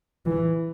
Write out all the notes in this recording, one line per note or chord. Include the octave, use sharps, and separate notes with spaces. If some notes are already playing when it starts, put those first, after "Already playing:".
E3